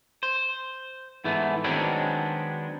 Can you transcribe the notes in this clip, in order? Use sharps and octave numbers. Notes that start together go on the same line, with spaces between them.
C5
G#2 E3 A3 B3
D#3 F#3 G#3 B3 C4 D4